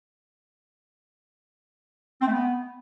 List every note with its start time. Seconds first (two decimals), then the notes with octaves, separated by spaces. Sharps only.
2.22 C4
2.27 A3
2.33 B3